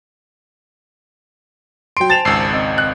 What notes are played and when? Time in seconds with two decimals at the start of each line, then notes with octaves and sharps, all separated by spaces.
1.97 F#3 G5 C6 D7
2.10 C5 G#5 A5 A6 E7 F7
2.25 G#1 C#2 E6 C7
2.53 C4 D#5
2.78 F#6